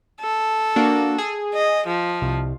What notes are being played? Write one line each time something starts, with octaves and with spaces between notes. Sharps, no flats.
A4
A#3 D4 F#4
G#4
D#5
F3
C2